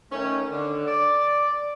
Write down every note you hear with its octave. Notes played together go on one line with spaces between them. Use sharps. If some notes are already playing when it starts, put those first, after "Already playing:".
D#3 A3 C#4
D3
D5